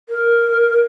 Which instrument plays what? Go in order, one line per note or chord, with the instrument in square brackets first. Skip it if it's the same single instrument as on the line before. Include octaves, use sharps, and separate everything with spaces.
[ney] A#4